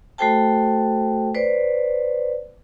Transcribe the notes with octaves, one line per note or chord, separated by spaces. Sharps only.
A3 F#4 A4 C5 G5 A5
B4 C5 D5